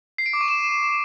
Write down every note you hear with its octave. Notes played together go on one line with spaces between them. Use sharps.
C7
D7
D6
C#6
E7